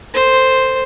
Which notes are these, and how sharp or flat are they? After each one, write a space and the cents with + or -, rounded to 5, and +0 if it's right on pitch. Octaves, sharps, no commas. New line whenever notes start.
A4 +25 C5 +0